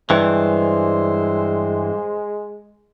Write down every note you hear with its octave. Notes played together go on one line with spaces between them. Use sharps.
G2 E3 G#3 C5